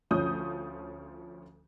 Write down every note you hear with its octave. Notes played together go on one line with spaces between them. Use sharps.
D2 F3 C#4 D#6 G6